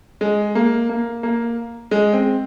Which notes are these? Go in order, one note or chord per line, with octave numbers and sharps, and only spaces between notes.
G#3
A#3
A#3
A#3
G#3
C4